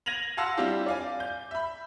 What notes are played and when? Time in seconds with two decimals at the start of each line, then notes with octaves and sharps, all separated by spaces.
0.06 G#6 A#6 D#7 F7 F#7
0.37 F5 F#5 A5 C6 E6 A#6
0.57 G3 C4 D4 E4 F4 G4
0.86 D5 F5 G#5
1.20 G6
1.51 E5 B5